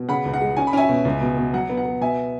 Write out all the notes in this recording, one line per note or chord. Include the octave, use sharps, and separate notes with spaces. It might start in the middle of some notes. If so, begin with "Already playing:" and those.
Already playing: B2
C#3 F#5 B5
C#2
F#5
G#3
C#4 G#5
B5
C#4 E5 G#5
B2
C#2
B2
B2
F#3 F#5
B3
F#5
B3
B2 E5 G#5